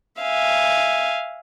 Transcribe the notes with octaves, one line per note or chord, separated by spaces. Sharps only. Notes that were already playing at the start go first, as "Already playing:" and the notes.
E5 F5 G#5